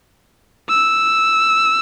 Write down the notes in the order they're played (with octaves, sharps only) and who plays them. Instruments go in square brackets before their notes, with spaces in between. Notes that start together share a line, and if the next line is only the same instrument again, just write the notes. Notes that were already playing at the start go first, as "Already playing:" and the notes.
[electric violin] E6